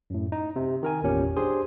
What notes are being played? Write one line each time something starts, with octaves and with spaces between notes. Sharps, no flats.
F#2 A2
D#4
C3
D#3 A#4 G#5
G#1 E2 A#2 C#4 G4
D4 G4 G#4 C5 G#5 C6